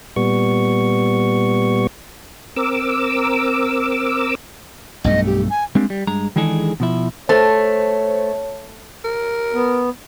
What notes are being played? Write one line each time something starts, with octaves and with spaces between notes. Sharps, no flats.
A#2 G3 B3 C#6
C4 A#4 D6 E6
B1 G2 A3 D#5
G4
G#5
G3 G#3 A#3 C4 D4
G3
G2 G#3 A#5
D#3 E3 G#3 D4 G#4 A4
B2 F3 E4
A3 A4 C5 C#5
A#4
B3